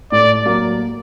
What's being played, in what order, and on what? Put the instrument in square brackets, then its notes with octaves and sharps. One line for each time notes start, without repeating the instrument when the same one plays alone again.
[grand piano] A2 [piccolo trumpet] D5
[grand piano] F#3 A#3